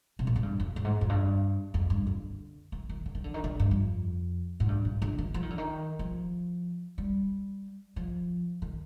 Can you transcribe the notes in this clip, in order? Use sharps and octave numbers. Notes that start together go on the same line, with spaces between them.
C3
A#2
G#2
G2
F2
G2
G#2
F2
G2
F2
G2
D3
D#3
D#3
D3
D#3
D3
D#3
D3
G2
F2
G#2
G2
G#2
D3
D#3
F3
D#3
D3
D#3
F3
G3
F3
D#3